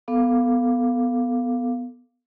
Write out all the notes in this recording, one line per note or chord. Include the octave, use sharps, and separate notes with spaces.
B3 A4 F5 D6